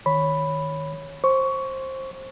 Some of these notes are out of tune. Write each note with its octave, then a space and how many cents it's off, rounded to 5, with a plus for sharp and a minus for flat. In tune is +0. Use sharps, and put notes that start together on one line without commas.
D#3 +0 C#5 +0 B5 +0
C5 +20 C#6 +20